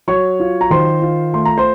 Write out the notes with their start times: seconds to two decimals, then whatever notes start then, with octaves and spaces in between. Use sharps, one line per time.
0.08 F#3 C#5 C#6
0.40 F4
0.61 A#5
0.70 D#3 C5 C6
1.02 F4
1.34 A3 C6
1.45 A#5
1.58 C5 C6